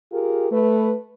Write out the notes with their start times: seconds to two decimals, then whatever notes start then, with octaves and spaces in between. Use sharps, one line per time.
0.12 F4 G4 G#4 A#4
0.51 A3 B4